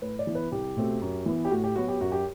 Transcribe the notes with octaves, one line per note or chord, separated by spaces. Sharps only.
A2 B4
D5
E3 B3
B4
C2 G4
B2 A3 C4
F#2
E3 B3
G4
A2 F#4
G4
F#3 B3 F#4
G4
F#2 F#4
G4